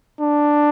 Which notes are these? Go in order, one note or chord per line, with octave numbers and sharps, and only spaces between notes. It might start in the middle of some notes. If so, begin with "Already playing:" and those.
D4